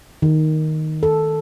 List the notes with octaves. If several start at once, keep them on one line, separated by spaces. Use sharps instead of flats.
D#3
A4